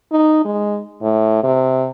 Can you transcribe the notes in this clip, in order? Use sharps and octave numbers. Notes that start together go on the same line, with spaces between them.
D#4
G#3
A2
C3